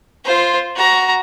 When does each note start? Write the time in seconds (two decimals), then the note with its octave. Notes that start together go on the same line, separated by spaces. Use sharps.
0.24 F4 C5
0.76 F#4 A#5